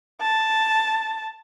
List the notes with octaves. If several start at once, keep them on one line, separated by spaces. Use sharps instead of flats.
A5